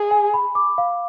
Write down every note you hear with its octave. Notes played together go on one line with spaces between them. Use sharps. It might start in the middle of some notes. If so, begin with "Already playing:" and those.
Already playing: G#4
G#5
B5
D6
F5